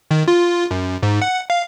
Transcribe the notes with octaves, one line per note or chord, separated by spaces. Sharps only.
D#3
F4
F#2
G#2
F#5
F5